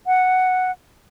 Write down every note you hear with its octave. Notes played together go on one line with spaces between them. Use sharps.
F#5